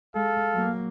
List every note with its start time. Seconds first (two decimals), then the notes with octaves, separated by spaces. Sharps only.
0.16 G#3 A4 F5
0.53 F#3 A#3